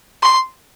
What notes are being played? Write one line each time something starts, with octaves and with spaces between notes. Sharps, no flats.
C6